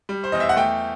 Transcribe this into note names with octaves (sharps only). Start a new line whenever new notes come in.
G3
C5
E2 D#5
E5
F#5
A3 G5